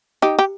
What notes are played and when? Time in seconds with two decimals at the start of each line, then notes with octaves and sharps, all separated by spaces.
0.22 D#4 G4
0.39 G4